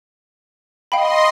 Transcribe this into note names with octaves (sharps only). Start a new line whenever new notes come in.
D#5 F5 G5 B5 C6